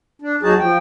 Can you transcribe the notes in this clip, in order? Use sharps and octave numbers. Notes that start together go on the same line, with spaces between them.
D4
D#2 F#3 D#4 F#4 G#4 A5
F3 G5